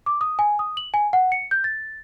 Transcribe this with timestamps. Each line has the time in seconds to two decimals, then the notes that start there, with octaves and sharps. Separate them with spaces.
0.06 D6
0.21 D#6
0.39 G#5
0.59 D#6
0.77 F#7
0.94 G#5
1.13 F#5
1.32 C#7
1.51 G6
1.64 A6